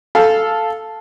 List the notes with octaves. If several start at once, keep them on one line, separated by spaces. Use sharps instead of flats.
A4 F5